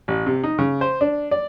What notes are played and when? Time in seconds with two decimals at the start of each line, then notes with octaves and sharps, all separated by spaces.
0.08 A1
0.26 C3
0.44 D#4
0.59 C#3
0.81 C5
1.01 D4
1.31 D5